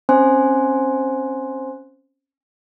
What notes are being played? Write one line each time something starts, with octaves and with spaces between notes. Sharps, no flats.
C4 C#4 C5 G#5 C6 F#6